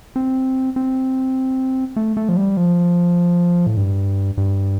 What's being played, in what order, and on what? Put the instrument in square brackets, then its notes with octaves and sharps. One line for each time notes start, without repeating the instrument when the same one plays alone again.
[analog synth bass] C4
C4
A3
A3
F3
G3
F3
A2
G2
G2